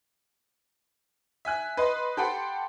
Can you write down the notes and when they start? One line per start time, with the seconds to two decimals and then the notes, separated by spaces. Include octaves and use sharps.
1.45 E5 G#5 F#6
1.77 B4 D#5 C6
2.17 G4 A4 F#5 G5 B5 C6